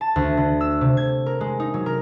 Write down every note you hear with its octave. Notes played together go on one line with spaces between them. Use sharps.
A5
D2
D3
E6
C3
G#6
A#4
G#3
D#4
F#3
A#4